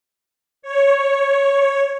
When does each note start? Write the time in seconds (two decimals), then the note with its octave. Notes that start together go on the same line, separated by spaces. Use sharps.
0.62 C#5